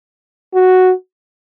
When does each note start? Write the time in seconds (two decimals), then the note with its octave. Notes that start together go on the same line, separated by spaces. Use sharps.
0.54 F#4